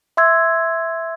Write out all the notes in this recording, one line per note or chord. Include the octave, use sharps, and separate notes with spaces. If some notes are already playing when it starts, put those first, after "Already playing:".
E5 C6 E6 G#6